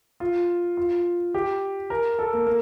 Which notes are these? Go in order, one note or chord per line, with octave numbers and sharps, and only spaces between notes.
F4
F4
G4
A#4
A4
A#3
A#3